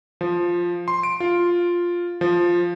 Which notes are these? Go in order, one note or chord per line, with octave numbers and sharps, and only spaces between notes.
F3
C6
D7
F4
F3